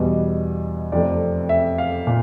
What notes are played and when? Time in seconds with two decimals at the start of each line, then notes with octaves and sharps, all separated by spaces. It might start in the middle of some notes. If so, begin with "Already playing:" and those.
Already playing: E2 B2 G3 D#5
0.92 F2 C3 F3 A3 D5
1.49 E5
1.78 F5
2.07 A#2